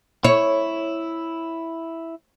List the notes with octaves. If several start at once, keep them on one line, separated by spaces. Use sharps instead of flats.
E4 C#5